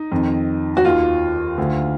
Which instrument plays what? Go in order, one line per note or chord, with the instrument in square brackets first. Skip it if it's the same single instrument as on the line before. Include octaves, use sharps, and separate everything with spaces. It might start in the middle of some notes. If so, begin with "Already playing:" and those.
Already playing: [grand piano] D#4
F2 D#3
F#4
D#2 D#3 F4
D2 D3